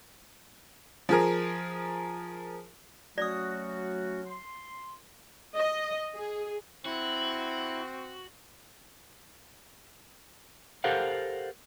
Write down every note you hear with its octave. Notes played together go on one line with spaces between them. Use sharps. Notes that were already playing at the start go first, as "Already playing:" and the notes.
F3 G#4 A#4
F#3 A3 C#4 F#4 D5 D#6 A#6
C6
D#5
G#4
C4 E4 F#4
G4 A4 A#4 C5 F5 F#5